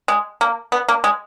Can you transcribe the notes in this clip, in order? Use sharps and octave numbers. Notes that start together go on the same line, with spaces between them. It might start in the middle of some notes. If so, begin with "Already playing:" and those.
G#3
A#3
B3
A#3
G#3